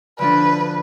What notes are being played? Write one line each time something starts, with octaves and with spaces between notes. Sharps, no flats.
D3 F3 D4 B4